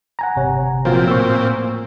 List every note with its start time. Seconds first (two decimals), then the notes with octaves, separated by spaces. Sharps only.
0.19 F#5 G#5 A#5
0.36 G1 C3 C#5
0.85 A#2 F3 C4 F4 F#4
1.08 A2 A#3 C#6 E6